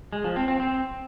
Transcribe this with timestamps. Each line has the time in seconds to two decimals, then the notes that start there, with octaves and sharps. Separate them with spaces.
0.13 G#3
0.24 F3
0.36 C4
0.48 C4
0.60 C4